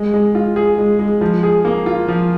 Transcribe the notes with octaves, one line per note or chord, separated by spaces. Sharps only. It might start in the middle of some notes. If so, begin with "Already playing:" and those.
Already playing: G#3
G#3
F4
G#4
G#3
G#3
F3
G#4
A#3
F4
F3